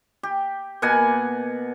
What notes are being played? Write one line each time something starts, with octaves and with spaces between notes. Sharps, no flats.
G4
B2 A#3 F#5 G#5